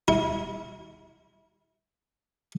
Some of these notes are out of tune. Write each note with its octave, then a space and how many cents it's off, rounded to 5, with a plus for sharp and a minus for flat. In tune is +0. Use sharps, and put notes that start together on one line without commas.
E4 -30